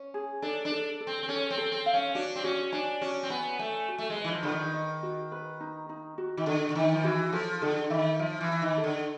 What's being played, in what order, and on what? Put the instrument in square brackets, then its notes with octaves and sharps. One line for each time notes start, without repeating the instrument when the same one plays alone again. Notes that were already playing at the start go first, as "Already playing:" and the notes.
Already playing: [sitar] C#4
[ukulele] G#4
[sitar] D4 [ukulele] A4
[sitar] D4
[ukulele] A4
A4
[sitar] C4
C4
[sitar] C#4 [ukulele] A4
[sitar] C4
[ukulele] A4
[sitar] C4
[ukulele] F5
[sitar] C#4
[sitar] D4 [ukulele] F#4
[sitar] C4
[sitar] C#4 [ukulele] F#4
[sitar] D4 [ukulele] G#5
[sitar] C#4 [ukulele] F#4
[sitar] C4
[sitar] B3 [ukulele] G#5
[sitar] A3 [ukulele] G#5
[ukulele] F#4
[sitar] A3
G#3
[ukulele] B4
[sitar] E3
F3
[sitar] D3 [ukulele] B4
[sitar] D#3
[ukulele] D#5
F#4
B4
D#4
D#4
F#4
[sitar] D#3
[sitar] D3 [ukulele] A4
[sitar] D3
[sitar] D#3 [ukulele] D#4
[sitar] F3
[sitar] E3 [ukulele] F#4
[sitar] F3 [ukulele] A4
[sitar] D3 [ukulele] A4
[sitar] D#3 [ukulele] E5
[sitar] F3 [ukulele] E5
[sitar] E3
[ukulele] E5
[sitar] D#3
[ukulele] A4
[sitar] D3